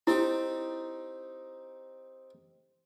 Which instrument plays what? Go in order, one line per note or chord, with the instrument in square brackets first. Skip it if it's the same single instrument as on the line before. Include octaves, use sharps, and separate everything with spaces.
[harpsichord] C4 D#4 G4 [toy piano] E4